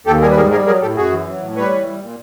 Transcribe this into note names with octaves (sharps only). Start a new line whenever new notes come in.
D#2 G4 A4
G3 G#4 A#4
B4
G#2 G#4 A#4
G3 G#4 A#4
F#3 G#4 A#4
A2 G4 A4
F#2 F#4 G#4
E3
F#3
A2
G3 B4 C#5
E3
G3
A#2